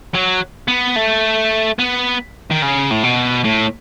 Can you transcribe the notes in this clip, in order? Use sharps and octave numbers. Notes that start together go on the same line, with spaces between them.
F#3
B3
A3
B3
D#3
C#3
A2
B2
A2